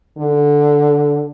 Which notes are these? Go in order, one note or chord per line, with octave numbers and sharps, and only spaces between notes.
D3